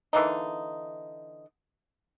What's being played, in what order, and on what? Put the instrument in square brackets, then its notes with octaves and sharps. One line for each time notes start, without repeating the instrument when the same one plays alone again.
[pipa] D3 E3 A#3 D#4